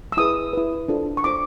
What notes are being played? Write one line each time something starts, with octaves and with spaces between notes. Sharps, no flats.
E6
E4 G#4 B4 D#6
E4 G#4 B4
D4 F4 A4 C5
C#6
D4 F4 A4 C5 D6